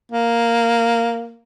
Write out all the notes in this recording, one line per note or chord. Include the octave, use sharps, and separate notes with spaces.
A#3